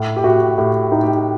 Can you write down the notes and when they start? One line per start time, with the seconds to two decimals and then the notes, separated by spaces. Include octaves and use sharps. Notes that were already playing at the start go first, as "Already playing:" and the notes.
Already playing: A2
0.16 G4
0.24 A2 F#4
0.58 A2 G4
0.92 A2 D#4
1.03 G4